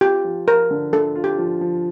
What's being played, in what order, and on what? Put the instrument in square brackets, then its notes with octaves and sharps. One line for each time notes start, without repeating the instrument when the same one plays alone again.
[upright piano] F4 [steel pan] G4
[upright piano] F3
[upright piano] F3 [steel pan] A#4
[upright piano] D3
[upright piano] D3 [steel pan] A4
[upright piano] F4
[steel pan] G4
[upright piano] F3
F3